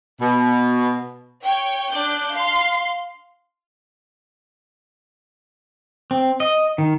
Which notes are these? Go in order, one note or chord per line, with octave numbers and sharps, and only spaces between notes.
B2
C#5 G5
D4 D6 F#6 G6
F5 C6
C4
D#5
D#3